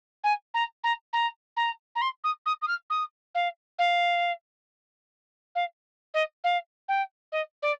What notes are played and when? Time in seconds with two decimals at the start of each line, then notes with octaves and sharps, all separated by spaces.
0.24 G#5
0.54 A#5
0.84 A#5
1.13 A#5
1.57 A#5
1.95 A#5
2.01 C6
2.24 D#6
2.46 D#6
2.62 D#6
2.68 F6
2.90 D#6
3.35 F5
3.79 F5
5.55 F5
6.14 D#5
6.44 F5
6.88 G5
7.32 D#5
7.62 D5